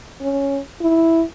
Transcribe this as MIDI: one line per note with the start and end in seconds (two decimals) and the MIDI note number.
0.21 0.59 61
0.81 1.23 64